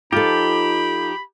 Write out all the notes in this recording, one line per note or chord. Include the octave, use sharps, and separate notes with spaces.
F3 D#4 F4 G4 A4 B5